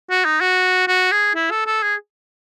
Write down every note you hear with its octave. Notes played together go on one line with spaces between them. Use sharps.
F#4
D#4
F#4
F#4
G#4
E4
A4
A4
G#4